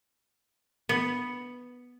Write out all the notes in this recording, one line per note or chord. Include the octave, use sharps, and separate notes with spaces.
B3